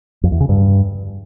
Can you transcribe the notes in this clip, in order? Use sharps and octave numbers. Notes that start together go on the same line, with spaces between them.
F2
E2
C#3
G2